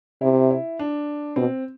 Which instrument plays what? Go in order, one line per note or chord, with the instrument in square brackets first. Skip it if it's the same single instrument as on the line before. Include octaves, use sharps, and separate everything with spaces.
[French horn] C3 [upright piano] E4
[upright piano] E4
D4
[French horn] B2 [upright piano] C4